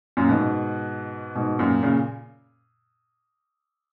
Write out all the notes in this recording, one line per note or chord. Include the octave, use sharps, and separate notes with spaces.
F#2 A#2
G#2 B2
G#2 B2
F#2 A#2
A#2 C#3